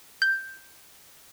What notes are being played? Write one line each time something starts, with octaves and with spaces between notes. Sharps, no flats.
G6